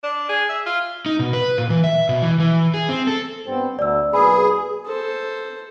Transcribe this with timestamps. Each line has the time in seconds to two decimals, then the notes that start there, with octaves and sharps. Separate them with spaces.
0.03 D4
0.29 G#4
0.49 E5
0.66 F4
1.06 D#4
1.19 B2
1.33 B4
1.58 A#2
1.70 E3
1.84 E5
2.09 B2
2.22 E3
2.40 E3
2.74 G#4
2.89 C4
3.07 A4
3.47 G2 B3 C4
3.79 D2 D5 E6
4.13 B1 A#3 G#4 B4 B5
4.86 A4 C5